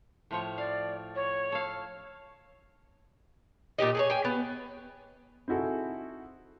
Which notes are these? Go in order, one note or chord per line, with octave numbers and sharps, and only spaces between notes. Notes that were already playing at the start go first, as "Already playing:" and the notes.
A2 F3 C#5
D5 F5
C#5
A4 F5
A#2 D#4 G4 D#5
G#4 A4 C#5
G5 G#5
B3
C4 D#4 E4 F#4 G#4 A4